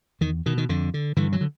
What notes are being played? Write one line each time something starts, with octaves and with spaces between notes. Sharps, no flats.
E2 D#3
B2 D#3
D#3
F2 D3
D3
G2 D3 E3
E3 F#3
D3